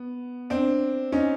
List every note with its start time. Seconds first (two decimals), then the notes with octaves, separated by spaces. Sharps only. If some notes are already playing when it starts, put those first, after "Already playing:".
Already playing: B3
0.50 C4 D4
1.12 C#4 D#4